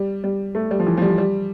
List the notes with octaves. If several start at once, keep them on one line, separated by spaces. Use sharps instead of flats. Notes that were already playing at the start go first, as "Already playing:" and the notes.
Already playing: G3
G3
A3
G3
F3
E3
F3
G3
G3